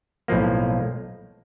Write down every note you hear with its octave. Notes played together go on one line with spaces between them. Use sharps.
B1 A2 F3 A#3